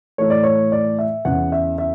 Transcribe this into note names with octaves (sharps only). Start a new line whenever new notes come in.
A2 E3 A3 C#5
D5
C#5
D5
E5
E2 C#3 E3 F#5
E5
E5